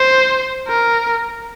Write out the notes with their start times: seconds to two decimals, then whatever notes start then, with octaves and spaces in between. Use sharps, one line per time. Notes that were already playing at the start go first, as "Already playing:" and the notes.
Already playing: C5
0.68 A#4